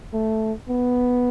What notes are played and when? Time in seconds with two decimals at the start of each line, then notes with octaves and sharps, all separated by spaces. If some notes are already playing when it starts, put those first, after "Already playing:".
0.13 A3
0.69 B3